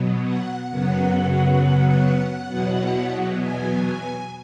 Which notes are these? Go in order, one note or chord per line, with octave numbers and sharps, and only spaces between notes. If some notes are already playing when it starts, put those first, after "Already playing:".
Already playing: B2 F#3 B3
F#5
F#2 C#3 F#3 B3 F#5
E2 B2 F#3 B3
G#5
G#5